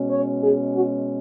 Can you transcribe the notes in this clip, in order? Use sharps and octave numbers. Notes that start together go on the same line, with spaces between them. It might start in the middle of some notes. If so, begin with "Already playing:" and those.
Already playing: B2 G#3 C#4
C#5
G#4
F#4